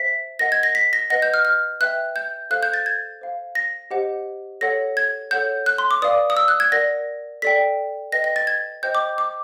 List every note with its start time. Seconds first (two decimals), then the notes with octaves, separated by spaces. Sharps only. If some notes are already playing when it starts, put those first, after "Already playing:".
Already playing: C5 E5 B6
0.39 A#4 D#5 F#5 A#6
0.52 G#6
0.63 A#6
0.75 B6
0.93 A#6
1.10 B4 D#5 F#5 A#6
1.22 G6
1.34 F6
1.45 F6
1.81 B4 E5 G5 F#6
2.16 G6
2.51 A4 C5 F5 F#6
2.63 G6
2.74 A6
2.86 G#6
3.21 C5 F5
3.55 A#6
3.91 G4 C5 D#5 F#5
4.61 A4 C#5 F#5 A#6
4.97 G#6
5.31 A4 C#5 F#5 G6
5.66 F#6
5.78 C6
5.91 D6
6.01 B4 D5 F5 D#6
6.30 D#6
6.37 E6
6.48 F#6
6.60 G#6
6.72 A#4 D5 F#5 A#6
7.42 A4 D5 G5 B6
8.12 B4 D#5 G5 A#6
8.24 A#6
8.36 A6
8.47 G#6
8.83 C5 D#5 G5 G6
8.95 D6
9.18 D6